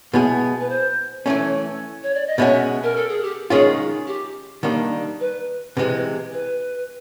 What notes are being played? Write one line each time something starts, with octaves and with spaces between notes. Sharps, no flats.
B2 G#3 B3 E4 G#4
B4
C5
E3 A3 C#4 C#5
C#5
D5
D#5
B2 G#3 C#4 F#4 E5
A#4
A4
G#4
G4
D#3 G#3 C#4 F4 G#4
G4
D#3 G3 A#3 D4
B4
C3 E3 G#3 B4
B4